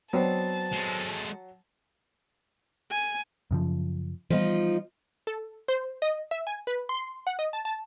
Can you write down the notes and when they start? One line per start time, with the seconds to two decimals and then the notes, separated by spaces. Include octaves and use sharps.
0.13 F#3 B3 C4 D4 A5
0.73 G#3 A4
2.91 G#5
3.51 F#2 C#3 F3
4.30 E3 F3 G3 B3 D#4 F4
5.27 A4
5.68 C5
6.02 D#5
6.31 E5
6.47 G#5
6.67 B4
6.89 C6
7.27 F#5
7.39 D#5
7.53 A5
7.65 A5